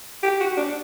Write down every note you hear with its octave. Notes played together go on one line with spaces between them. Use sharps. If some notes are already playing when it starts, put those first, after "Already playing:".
G4
F#4
D4